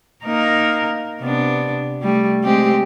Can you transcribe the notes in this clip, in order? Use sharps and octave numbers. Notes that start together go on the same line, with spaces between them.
A#3 D#4 A#4
C3 B3 D4
G3 A3
G#3 C4 G4